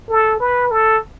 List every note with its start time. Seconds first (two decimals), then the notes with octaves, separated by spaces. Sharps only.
0.10 A4
0.40 B4
0.71 A4